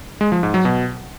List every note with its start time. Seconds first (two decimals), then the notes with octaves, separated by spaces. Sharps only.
0.21 G#3
0.32 F3
0.43 G#2
0.54 F#3
0.65 B2